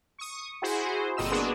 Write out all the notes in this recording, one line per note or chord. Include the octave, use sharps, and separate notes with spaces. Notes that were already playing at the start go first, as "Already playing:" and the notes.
C#6 D#6
E4 F#4 G#4 C5
G1 A#2 C4 D#5 E6 E7
A#3 B3 D4 F#4 G#4